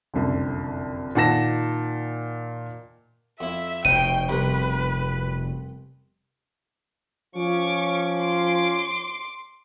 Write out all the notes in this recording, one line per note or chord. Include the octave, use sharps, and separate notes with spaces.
F#1 C2 F2 D3
A#2 D#3 F#5 A5 A#6 E7
F2 E4 E5
F1 B2 G5 D#7
C2 A#4 B4
F3 C#4 C#6 D6
C6 D6